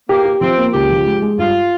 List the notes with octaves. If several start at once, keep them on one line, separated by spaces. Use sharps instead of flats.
A#3 G4
G4
F3 C4
A#3
C#2 G4
F3
G#3
G#3
G2 F4